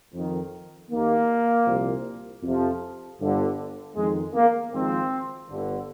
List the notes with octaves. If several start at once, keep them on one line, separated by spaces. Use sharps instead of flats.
F2 D#3
D#2 D#3 A#3
C2 A#2 F3
F2 C3 F3
G1 G2 D3
F2 D#3 G#3
A#3
G#1 G#2 F3 C4
G1 G2 D3